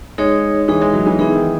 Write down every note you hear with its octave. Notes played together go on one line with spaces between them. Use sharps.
G#3 D#4 G#4 C#5
E3 D#4 G#4 C#5
G#3
F#3
E3
E3 B3 D#4 G#4
D#3